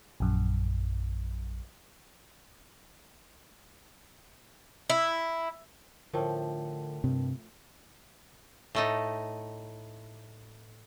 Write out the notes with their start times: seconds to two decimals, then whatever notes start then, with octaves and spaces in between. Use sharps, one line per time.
0.20 A#1 F#2
4.90 E4
6.13 A2 D3 F3 A#4 G5 A5
7.04 G2 C3
8.75 A2 A3 D#4